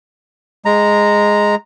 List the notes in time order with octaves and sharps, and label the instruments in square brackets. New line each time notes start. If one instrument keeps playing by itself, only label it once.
[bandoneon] G#3 A#5